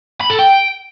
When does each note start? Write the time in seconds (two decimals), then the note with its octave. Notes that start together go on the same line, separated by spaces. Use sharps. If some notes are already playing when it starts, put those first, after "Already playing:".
0.21 B5
0.30 A4
0.39 G5